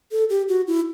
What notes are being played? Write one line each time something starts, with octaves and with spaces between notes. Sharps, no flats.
A4
G4
F#4
E4